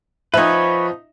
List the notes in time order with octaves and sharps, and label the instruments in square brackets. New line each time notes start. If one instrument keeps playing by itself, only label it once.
[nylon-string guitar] F3 C4 [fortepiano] D#4 E5 [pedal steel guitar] B4 C#5